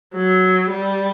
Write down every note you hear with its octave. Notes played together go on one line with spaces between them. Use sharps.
F#3
G3